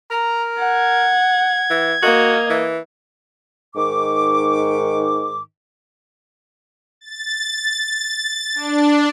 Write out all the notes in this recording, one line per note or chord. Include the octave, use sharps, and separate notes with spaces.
A#4 A#5
F#5 G#6
E3
A#3 F#4 D#5
E3
G#2 D#3 C#6 D6
A6
D4